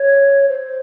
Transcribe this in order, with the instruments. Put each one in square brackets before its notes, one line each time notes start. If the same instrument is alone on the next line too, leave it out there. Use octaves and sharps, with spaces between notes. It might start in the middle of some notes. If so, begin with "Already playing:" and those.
Already playing: [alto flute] C#5
C5